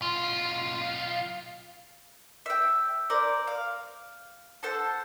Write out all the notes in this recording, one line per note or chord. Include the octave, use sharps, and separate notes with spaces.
B1 F4
E5 G5
A#4 C5 D5
F5
A4 C5 F#5 A5